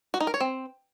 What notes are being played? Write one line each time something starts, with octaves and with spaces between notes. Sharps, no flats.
F#4
D#4
A#4
C#5
C4